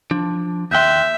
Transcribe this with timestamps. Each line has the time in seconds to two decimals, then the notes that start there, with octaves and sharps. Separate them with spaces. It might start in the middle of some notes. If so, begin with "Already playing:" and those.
0.11 F3 D4
0.71 D#2 E5 G5 C6 F#6 G6